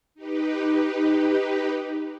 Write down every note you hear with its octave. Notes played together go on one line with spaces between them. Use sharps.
D#4 G4 B4